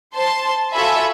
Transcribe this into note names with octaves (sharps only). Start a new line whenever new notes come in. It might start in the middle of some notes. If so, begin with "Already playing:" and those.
C5 A5 C6
F4 F#4 A4 E5 G#5 B5